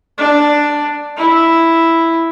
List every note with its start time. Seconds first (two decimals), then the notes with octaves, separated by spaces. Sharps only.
0.18 D4
1.16 E4